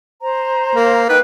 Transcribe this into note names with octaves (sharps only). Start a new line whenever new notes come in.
C5 A#5
A#3
D#4 B4 G5 F#6